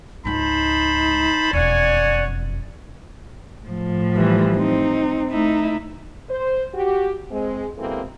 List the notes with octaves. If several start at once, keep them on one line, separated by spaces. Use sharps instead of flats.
C#2 G#2 D#4 C5 A5 B5
E1 F2 C#5 D5 F#5 G#5
A2 F3
E3 G3
C4 D#4
A3 D#4 E4
C5
F#4 G4
G#3 C4
B2 E3 G#3 A#3 C4 A4